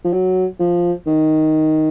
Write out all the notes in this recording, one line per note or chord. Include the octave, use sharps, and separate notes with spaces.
F3
F#3
F3
D#3